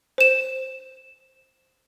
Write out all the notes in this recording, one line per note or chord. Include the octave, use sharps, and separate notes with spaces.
C5 E7